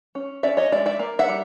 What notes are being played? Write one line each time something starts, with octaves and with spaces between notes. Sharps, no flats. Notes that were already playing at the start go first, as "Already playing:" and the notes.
C#4
C#4 D5 E5
C#5 D#5
G#3 D5 E5
D5 E5
A#3
E5 F#5
G3